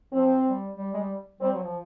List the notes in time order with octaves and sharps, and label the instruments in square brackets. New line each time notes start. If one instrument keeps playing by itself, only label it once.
[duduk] F3 [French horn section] C4
[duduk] G3
G3
G#3
G3
[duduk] G3 [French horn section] C4
[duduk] F#3
F3